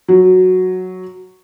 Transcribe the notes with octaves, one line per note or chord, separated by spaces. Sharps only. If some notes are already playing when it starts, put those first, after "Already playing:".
F#3